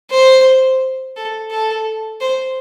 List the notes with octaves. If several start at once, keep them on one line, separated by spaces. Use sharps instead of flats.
C5
A4
A4
C5